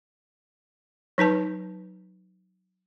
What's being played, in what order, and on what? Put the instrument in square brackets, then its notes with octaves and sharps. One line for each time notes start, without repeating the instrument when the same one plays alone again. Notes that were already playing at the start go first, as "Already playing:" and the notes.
[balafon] F#3 D#4 B4 A5